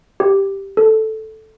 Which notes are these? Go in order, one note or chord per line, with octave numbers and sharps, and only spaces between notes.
G4
A4